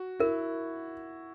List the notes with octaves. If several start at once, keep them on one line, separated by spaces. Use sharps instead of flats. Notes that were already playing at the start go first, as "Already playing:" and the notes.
Already playing: F#4
E4 A#4